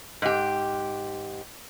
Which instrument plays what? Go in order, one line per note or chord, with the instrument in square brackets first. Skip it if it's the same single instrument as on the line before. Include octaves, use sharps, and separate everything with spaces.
[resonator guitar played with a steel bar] G#2 G4